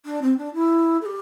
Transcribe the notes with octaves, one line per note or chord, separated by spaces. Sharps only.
D4
C4
D4
E4
A4
G4